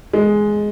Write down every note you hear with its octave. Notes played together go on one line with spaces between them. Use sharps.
G#3